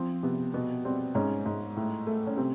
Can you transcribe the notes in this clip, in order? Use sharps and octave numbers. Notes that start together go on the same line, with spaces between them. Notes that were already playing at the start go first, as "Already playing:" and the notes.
Already playing: F3 C4
C3 B3
B2 B3
G3 C4
G#2 C#4
G#2
A2
A3
C#4
C3 C4